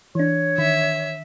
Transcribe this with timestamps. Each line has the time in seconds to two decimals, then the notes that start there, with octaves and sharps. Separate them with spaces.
0.15 E3 D4 C#5
0.58 D#3 E5